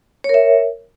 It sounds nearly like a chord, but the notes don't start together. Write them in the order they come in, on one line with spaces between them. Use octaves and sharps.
C#5 A#4 E5